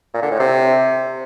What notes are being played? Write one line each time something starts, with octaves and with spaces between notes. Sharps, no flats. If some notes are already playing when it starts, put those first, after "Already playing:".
A#2
D3
A2
C3